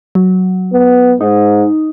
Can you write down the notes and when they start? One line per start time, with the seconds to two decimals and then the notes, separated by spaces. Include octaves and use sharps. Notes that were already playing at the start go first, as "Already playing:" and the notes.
0.15 F#3
0.73 B3
1.21 G#2 D#4